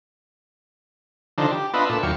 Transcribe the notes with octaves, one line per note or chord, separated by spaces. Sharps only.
D3 F3 D4 D#4 C5
G4
B3 D4 F4 B4 D#5 E5
A#2 D4 A4 E5
D#2 F#3 F5 G5 C#6